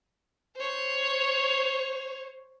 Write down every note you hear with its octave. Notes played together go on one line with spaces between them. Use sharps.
C5 C#5